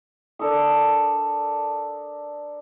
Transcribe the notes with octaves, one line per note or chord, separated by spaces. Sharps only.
D4 A4 A#4 D#6